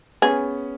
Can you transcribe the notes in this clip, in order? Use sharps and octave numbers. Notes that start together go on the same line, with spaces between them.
B3 C#4 G#4